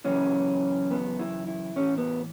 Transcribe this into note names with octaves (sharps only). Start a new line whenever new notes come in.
F#2 C#3 E3 C#4
B3
E4
E4
A2 E3 C#4
B3